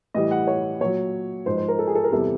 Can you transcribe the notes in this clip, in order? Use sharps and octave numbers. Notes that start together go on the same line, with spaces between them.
A2 E3 G3 D#5
F#5
C#5
A#2 F#3 C#5
G#2 F3 C5
C5
A#4
A4
G#4
A4
A#4
E2 C3 E3 G3 A4